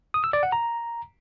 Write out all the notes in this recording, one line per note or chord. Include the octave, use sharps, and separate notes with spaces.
D#6
E6
D5
F#5
A#5